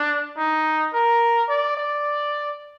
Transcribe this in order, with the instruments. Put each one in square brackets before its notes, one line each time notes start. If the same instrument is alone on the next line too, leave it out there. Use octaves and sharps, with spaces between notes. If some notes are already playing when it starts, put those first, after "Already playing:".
Already playing: [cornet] D4
D#4
A#4
D5
D5